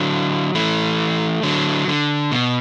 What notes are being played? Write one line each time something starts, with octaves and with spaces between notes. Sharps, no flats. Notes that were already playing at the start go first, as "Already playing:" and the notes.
Already playing: D3 F#3
E3 A3
D3 F#3
D3
B2